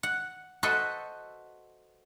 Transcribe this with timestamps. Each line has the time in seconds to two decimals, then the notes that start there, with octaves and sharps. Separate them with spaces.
0.03 F#5
0.63 F#4 A4 B4 C5 D#5 E5